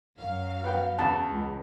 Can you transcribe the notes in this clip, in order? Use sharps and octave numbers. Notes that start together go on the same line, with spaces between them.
F#2 F#3 F5
B3 F#4 G5
E2 C#3 A5
C#2